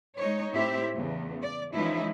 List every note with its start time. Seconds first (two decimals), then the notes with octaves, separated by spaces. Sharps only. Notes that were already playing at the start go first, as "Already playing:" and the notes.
0.19 G#3 D#4 C#5
0.52 A2 A3 C4 E4 G4 E5
0.94 E2 C#3
1.41 D5
1.73 E3 F3 G#3 C#4 D#4 E4